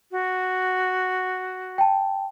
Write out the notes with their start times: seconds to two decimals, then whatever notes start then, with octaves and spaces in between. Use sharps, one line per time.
0.12 F#4
1.78 G5 A5